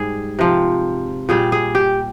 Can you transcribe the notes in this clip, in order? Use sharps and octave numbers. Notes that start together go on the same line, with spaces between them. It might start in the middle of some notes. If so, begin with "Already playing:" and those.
Already playing: G#2 G3 G#4
C3 F3
A#2 G3 G#4
G#4
G4